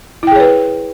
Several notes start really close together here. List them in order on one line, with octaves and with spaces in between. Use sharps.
E4 G5 G#4 C#5 B4